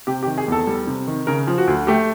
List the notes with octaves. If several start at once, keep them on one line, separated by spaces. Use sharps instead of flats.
C3 G4
G4
D#3
G#4
E2 A4
G3
C3
D#3
C#3 A#4
F3
F#4
D2
A3 G4